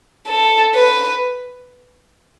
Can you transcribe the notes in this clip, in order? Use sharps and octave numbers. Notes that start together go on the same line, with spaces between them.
A4
B4